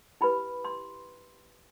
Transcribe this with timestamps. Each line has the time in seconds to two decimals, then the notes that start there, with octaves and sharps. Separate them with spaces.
0.21 E4 G4 B4 B5
0.65 C6